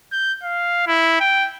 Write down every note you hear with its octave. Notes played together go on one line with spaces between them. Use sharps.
G6
F5
E4
G5